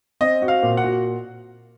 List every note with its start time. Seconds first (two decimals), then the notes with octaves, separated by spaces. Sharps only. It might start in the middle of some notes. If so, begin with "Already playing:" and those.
0.21 C4 D#5
0.42 F#4
0.48 F5
0.63 A#2
0.77 F#5
0.84 F#4